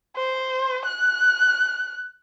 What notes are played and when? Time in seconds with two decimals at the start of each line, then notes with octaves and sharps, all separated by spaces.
0.16 C5
0.85 F#6